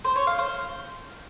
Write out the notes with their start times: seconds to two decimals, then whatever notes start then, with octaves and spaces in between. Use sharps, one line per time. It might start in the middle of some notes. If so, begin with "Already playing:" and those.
0.04 C5
0.16 C#5
0.27 F5
0.38 C5